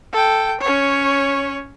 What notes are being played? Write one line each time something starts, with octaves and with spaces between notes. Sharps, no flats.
A4 G5
C#4 C#5